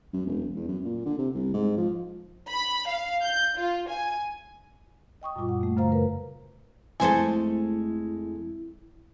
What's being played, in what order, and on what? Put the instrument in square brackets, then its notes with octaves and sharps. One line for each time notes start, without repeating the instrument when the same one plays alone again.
[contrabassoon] F#2
E1
E2
F#2
A#2
D3
C3
C2
G#2
F3
[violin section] B5
F5
G6
F4
G#5
[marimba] D#5 G5 C#6 D#6
F#2 A#2 G3 F4 D6
F#5
A3 A#3
F#2 C#3 A3 C5 F5 A#5
A#4 B4
[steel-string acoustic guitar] F2 G#3 A3 [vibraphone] E4 [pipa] A4 C5 G#5